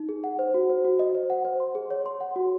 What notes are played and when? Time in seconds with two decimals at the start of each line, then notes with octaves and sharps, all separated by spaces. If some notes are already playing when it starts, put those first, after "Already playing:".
Already playing: D#4
0.09 G#4
0.24 F#5
0.39 C5
0.54 F#4
0.70 C5
0.85 F#4
0.99 D#5
1.15 C5
1.30 F#5
1.45 C5
1.60 C6
1.75 G#4
1.90 C#5
2.06 C6
2.21 F#5
2.36 F#4